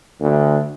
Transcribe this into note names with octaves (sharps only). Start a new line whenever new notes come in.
D2